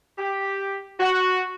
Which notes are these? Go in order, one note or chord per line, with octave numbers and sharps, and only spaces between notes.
G4
F#4